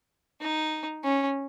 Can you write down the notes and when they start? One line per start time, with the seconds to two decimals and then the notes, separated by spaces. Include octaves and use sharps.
0.41 D#4
1.04 C#4